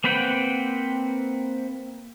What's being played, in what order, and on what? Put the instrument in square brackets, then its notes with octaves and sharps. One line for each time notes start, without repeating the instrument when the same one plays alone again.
[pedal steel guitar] A#3 C4 B4 F#5 G5